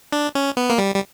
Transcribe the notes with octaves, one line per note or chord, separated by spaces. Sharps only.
D4
C#4
B3
A#3
G3
G3